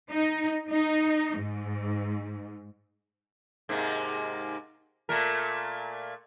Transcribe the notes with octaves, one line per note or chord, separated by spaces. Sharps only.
D#4
D#4
G#2
G#2 C3 A#3
A#2 A3 A#4